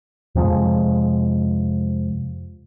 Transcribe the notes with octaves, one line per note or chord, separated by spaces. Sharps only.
F2 C3 F3 G#3